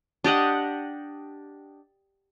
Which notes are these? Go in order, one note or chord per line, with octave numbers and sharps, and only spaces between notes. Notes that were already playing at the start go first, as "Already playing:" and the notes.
D4 G4 D#5 F#5